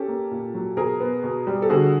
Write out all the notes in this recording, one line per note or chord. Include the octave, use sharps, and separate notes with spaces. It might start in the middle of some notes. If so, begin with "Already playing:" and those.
Already playing: C#4 G4 A4
A#3
A#2
F#3
B2 G#4 A#4
B3
B2
G3
A4
D3 F#4 G#4